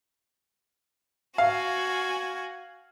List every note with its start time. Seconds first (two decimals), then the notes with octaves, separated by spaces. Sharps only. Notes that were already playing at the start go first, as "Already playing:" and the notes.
1.38 F#4 F5 G#5